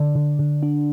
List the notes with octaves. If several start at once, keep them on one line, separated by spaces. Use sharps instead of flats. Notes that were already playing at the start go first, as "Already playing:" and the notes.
Already playing: D3 D5
D3
D3
D4